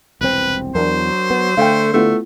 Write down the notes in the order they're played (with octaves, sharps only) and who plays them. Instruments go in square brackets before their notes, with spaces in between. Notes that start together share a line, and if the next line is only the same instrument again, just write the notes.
[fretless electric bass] E1 C2 C4 [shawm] B4
[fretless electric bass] E2 [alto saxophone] F#3 [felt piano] D4 A#4 [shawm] C5
[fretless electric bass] B3
[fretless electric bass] D3 [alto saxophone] A3 [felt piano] F5 G5
[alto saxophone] A3 [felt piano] B3 E4 F4